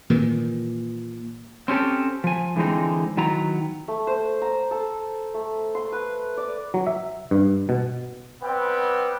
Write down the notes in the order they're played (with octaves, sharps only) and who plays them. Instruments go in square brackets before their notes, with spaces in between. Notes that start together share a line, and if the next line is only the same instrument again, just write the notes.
[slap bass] A#2 D#3 E3
[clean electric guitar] C4 C#4 G4 A4
F3 G#5
D3 E3 G#3 C4 D#4
D#3 F#3 B3 E4 A#5
[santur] A3
C5
A#5
A4
A3
C6
B4
D5
[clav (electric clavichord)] F#3
E5
G2
B2
[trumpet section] G3 B3 C4 G5